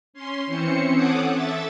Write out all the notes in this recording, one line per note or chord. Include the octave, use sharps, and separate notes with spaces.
C#4 C6
E3 C4 C#4 C5 C#7
A4 C#5 F#5 D6 D#6
A4 E5 A6